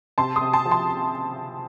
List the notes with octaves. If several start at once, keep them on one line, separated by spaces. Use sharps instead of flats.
C3 A5 C6
C6 D#6
C3
A5 C6
F3
A5 C6